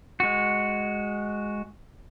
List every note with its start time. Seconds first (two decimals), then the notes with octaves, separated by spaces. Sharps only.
0.20 G#3 F#4